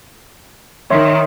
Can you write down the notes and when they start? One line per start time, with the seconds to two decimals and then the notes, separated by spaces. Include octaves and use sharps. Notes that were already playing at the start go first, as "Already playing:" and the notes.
0.91 D#3 C#5 E5 C6